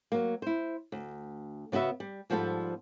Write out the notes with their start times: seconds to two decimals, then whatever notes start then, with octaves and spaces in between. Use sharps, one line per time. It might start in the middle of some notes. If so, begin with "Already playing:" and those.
0.12 F#3 A#3
0.42 E4 C5
0.92 D2
1.72 C#3 B3 F#4 B4 E5
2.00 G3
2.30 G#2 F3 G3 B3 A4